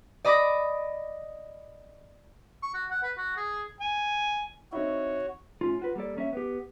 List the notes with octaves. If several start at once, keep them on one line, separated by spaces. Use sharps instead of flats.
D5 D#5 B5 D6 D#6 A#6
C#6
F#4
F#5
B4
F#4
G#4
G#5
C4 D#4 E4 F#4 C#5
A2 C#4 F4
F4 F#4 B4
G3 A#3 A4 D5
A#3 C#4 D5 E5
B3 G4